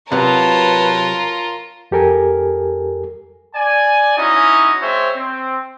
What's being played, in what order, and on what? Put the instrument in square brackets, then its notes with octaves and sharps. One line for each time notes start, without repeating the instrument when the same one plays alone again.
[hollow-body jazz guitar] C3 F#3 [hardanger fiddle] F4 A#4 [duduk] B4 [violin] C#5 A5
[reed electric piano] F2 G4 A4 A#4 G#5
[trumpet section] D5 G#5
C#4 D#4 E4 F#4 D#5
G#3 C4 C5 C#5 E5
C4